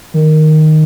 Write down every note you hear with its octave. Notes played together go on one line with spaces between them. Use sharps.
D#3